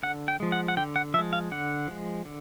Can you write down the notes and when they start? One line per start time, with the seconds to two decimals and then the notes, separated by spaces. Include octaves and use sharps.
0.03 D3 F#5
0.28 G5
0.40 F3 G#3
0.52 F#5
0.68 F#5
0.77 D3 G5
0.96 F#5
1.14 F3 E5
1.18 G#3
1.33 F5
1.51 D3 F#5
1.88 F3 G#3
2.25 D3